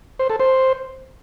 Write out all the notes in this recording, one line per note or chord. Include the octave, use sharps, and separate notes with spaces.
C5
A4
C5